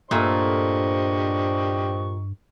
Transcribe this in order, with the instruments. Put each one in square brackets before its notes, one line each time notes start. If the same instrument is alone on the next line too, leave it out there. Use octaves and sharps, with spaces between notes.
[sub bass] G2 [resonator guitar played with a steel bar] A#2 A3 [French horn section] D4 C5 [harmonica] G4 D#5 C#6